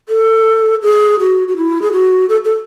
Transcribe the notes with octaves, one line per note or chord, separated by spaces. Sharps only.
A4
G#4
F#4
F#4
E4
G#4
F#4
A4
A4